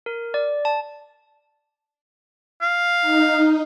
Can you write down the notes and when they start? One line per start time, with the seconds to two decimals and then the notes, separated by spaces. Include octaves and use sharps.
0.06 A#4
0.34 D5
0.65 A5
2.61 F5
3.01 D#4